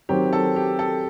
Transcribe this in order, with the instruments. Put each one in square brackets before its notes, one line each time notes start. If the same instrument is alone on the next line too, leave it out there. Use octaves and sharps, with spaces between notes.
[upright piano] D#3 F#3 C4 [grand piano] G4
[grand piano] A4
G4
A4